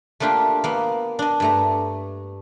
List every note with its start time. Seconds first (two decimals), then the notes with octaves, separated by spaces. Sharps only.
0.20 A3 A#3 D4 F4 G4
0.64 A#3 B3
1.19 D4 D#5
1.40 G2 A3 A#5